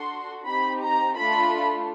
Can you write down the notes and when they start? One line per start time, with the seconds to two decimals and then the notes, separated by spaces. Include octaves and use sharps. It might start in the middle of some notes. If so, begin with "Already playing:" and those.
Already playing: D4 F#4 A4 C6
0.46 C4 D#4 G4 B5
0.82 A#5
1.16 A3 D4 F4 A4 B5